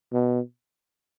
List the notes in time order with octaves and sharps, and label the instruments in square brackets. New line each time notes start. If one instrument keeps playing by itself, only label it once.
[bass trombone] B2